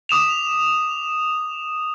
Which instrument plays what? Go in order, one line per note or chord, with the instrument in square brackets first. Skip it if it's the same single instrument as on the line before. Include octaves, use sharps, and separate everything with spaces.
[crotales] D6 D#6 E7 F7